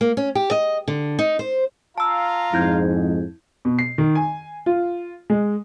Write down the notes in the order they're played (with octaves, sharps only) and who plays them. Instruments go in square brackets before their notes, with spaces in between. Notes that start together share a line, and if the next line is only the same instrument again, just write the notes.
[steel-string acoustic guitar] A#3
C#4
G4
D#5
D3
D#4
C5
[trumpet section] F4 F5 A#5 [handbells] A5 E6
[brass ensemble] F2 G#2 [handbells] E4 G6 G#6
[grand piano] B2
C7
D#3
G#5
F4
G#3